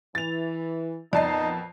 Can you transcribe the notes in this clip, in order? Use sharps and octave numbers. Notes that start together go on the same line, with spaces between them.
E3 A6 F7
F2 A#2 B3 D#4 D5 D#5 A5 C7